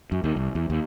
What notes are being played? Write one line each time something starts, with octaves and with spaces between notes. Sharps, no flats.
F#2
D#2
C2
E2
D#2